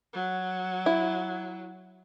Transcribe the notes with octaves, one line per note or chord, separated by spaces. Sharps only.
F#3
E4